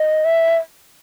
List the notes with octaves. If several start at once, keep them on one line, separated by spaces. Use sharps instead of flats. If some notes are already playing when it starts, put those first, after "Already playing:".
Already playing: D#5
E5